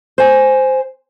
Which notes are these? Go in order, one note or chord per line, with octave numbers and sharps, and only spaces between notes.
C5 G#5